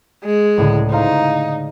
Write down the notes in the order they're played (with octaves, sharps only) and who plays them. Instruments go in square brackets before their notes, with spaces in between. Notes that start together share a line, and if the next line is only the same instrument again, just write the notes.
[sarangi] G#3
[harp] C#2 A2 D3
[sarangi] D#4 [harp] C5 F5 A#5